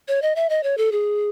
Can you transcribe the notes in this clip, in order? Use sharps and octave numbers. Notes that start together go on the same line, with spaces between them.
C#5
D#5
E5
D#5
C#5
A4
G#4